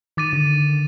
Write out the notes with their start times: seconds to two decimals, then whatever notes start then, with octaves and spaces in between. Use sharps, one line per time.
0.17 D#3 D6 A6 D#7
0.33 D3